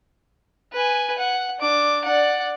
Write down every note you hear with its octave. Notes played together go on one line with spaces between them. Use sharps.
B4 G#5
F#5
D4 D6
D5 F#5